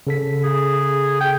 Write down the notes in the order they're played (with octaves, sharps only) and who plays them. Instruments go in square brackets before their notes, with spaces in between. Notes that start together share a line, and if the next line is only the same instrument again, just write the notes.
[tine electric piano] C#3 A4 B6
[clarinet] G#4
G5